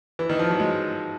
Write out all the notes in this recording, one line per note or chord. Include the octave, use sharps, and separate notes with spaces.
E3
D#3
F3
F#3
G#3